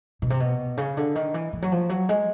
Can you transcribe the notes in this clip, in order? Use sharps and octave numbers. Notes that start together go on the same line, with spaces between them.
B2
C3
B2
C#3
D3
D#3
E3
E3
F#3
F3
F#3
G#3